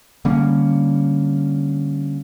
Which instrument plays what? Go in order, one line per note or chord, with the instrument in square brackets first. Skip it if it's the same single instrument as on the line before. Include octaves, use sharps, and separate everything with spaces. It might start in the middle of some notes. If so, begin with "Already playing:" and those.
[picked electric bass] D3 G3 A#3 C#4